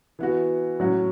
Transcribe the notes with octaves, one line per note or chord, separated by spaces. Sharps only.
E3 B3 F#4
A2 F#3 C#4 F#4